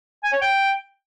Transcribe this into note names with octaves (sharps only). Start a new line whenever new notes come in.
G#5
C#5
G5